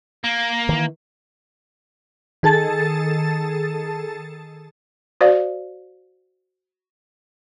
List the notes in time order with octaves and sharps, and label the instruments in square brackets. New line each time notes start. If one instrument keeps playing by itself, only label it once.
[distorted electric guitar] A#3
[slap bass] D#3 E3
[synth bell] D#3 G#4 A4 A5 A6
[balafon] F#4 C5 D5 F5